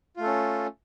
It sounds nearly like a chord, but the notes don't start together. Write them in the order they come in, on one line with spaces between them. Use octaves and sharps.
F4 A3 A4 C#4